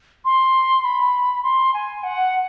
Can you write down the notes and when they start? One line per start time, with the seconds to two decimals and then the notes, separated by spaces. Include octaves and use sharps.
0.25 C6
0.84 B5
1.43 C6
1.74 G#5
2.04 F#5